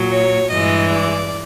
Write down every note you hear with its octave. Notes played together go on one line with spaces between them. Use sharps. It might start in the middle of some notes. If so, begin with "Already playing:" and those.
Already playing: A#2 F#3
C#5
G2 E3 G#3 D#5
D5